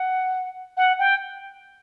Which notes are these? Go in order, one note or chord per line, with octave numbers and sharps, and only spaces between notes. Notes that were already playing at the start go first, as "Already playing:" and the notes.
Already playing: F#5
F#5
G5